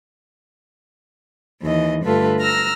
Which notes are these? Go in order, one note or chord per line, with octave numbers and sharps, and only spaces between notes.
D#2 E3 D#5
G2 D3 A3 F4 A4 B4
A#5 E6 F6 A#6